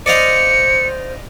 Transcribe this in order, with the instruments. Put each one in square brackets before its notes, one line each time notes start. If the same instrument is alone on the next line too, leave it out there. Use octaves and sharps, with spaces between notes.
[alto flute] C5 [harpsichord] D5 D#5 F5 [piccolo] C#7